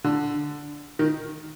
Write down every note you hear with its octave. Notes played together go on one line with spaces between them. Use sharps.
D3
D#3